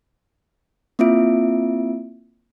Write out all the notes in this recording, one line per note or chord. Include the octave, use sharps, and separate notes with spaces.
A#3 C4 E4 F4 E5 D7